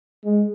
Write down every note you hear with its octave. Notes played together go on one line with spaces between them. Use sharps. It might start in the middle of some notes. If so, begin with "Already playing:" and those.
G#3